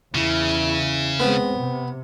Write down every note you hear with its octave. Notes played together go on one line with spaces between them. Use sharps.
E2 C#3 E4
G#3 B3 C4
C3